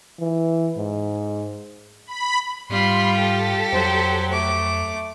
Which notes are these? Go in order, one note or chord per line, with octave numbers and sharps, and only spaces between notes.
E3
G#2
B5
G#2 G3 F4 B5 C6
G4 A4
F2 F#3 C5
A3 D6